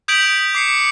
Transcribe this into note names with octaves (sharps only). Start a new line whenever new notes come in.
D#6 G6 G#6 B6 D7 F#7
D6 C7 C#7